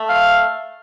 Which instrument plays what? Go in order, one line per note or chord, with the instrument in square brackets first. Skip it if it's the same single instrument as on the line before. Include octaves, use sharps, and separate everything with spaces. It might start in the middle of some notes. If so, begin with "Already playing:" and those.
Already playing: [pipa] A3
[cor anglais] F5